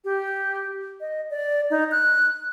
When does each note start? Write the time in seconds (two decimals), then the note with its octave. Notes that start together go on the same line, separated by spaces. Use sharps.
0.04 G4
1.00 D#5
1.30 D5
1.70 D#4
1.91 F#6